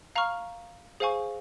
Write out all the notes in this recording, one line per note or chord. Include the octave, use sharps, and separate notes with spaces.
F5 A#5 C#6 F6
G#4 C5 F5 G#5 C#6